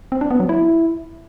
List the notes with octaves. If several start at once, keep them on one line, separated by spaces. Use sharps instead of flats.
C4
D4
B3
F#3
E4